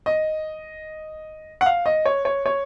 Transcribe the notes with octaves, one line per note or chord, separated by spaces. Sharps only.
D#5
F#5
F5
D#5
C#5
C#5
C#5